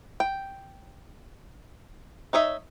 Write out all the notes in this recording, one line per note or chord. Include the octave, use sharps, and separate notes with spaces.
G5
D#4 C#5 D#5 E5